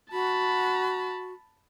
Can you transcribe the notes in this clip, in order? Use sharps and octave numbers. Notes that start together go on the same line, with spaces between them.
F#4 A5 B5